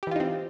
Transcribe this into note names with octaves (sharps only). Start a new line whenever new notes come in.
E3 C4 D#4 F4 G4